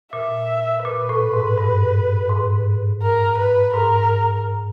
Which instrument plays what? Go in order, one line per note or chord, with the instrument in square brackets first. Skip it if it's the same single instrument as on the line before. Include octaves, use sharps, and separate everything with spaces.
[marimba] A#2 [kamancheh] E5
[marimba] A#2 [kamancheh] B4
[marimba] A2
G#2
G2
G#2
[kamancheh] A#4
B4
[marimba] G#2 [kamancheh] A#4